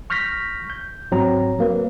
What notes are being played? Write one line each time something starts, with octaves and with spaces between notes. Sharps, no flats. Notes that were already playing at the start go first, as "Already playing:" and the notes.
C#6 F6 G6 A#6 B6
G6
G#2 F#3 C4 A#5
F#3 A#3 B4